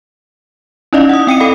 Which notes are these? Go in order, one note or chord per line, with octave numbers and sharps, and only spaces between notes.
C#4 D#4 E4 D5 D#5 F5
F#5 D#6
C4 G5 C#7 D#7
A4 F5 G5 B5